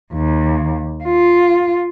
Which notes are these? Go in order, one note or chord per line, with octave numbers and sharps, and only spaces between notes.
D#2
F4